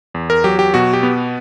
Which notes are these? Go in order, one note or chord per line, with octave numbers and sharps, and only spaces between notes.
E2
A#4
F#3 G4
G4
B2 F#4
G4
B3